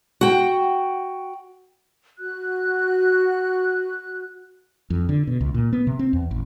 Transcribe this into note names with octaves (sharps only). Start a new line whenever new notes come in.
F#4 G5
F#4 F#6
F2
D3
B2
C#2
A#2
B3
C3
C4
E2
A1